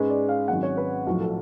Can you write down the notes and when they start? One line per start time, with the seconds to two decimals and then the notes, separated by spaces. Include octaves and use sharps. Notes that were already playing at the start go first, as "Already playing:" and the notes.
Already playing: G#2 G#3 C#4 B4
0.10 D5
0.29 F5
0.48 G#1 G#2 F#3 C#4 F#5
0.63 C#5
0.77 B4
1.06 B1 A2 F3 F#4
1.21 A4